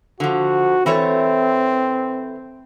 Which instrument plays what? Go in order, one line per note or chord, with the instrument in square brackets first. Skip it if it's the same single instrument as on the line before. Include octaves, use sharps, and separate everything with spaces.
[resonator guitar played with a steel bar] D3 F3 [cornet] F#4
[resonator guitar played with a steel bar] E3 A3 C#5 [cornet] C4